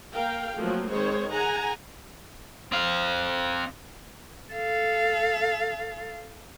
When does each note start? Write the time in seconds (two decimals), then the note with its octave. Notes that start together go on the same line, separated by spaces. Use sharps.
0.11 A#3 A#4 F5 G5
0.57 F3 F#3 A3 A#3 C4
0.89 D#3 G#3 C4 C5 C#5
1.32 G#4 F#5 G#5 A#5
2.72 C4 F5
4.53 A4 F5